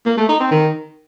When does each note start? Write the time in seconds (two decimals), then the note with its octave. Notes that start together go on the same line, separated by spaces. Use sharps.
0.06 A#3
0.17 A3
0.29 D#4
0.40 C4
0.51 D#3